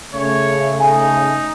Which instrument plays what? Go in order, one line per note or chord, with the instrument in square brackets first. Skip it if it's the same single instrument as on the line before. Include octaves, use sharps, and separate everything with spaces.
[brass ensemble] C#3 A3 [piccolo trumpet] C#5
[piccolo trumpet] D#4 [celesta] G#5